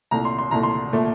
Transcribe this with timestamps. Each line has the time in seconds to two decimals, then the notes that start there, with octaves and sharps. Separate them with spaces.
0.11 C2 A#2 A3 A#5
0.25 C6
0.38 C6
0.51 C2 A#2 A3 A#5
0.63 C6
0.93 A#2 A3